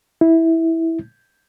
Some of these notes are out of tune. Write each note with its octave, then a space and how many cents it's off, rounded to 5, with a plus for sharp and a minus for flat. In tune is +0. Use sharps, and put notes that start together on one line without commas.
E4 -10